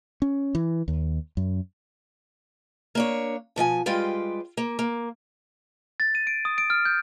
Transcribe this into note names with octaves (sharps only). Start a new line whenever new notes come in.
C#4
E3
D#2
F#2
A#3 D4 C#5
B2 F3 D#5 G#5
G3 G#3 F4 G4 B4 G5
A#3
A#3
A6
D#7
D7
D#6
D7
F6
G6